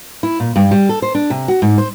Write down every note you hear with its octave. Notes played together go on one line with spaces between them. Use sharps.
E4
A#2
G2
G3
A4
C5
D4
C3
F#4
G#2
C5